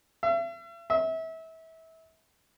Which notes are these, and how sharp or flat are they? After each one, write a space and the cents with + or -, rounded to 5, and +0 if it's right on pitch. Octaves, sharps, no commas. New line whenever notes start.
E5 +40
E5 -30